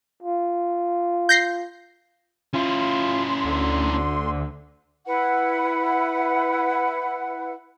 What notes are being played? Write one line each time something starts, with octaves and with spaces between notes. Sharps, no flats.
F4
G6 A#6 C7
C#4 E4 F4 C6
D2 D3
E4 B4 F#5